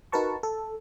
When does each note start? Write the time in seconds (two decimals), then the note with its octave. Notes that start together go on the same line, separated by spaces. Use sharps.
0.12 D#4 F#4 A#4 B4 A5 C#6
0.43 A4